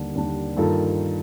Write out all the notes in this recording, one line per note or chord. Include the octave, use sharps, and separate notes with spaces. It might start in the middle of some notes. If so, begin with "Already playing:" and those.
Already playing: D#2 D3 G3 D4
D#2 D3 G3 D4
G2 D#3 A#3 F4 A4